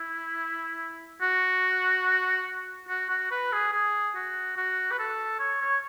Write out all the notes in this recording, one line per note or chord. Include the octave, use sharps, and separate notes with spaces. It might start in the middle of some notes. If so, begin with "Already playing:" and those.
Already playing: E4
F#4
F#4
F#4
B4
G#4
G#4
F#4
F#4
B4
A4
C#5
C#5